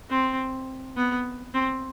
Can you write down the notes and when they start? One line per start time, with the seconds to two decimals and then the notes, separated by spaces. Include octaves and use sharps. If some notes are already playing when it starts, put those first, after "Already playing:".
0.10 C4
0.97 B3
1.54 C4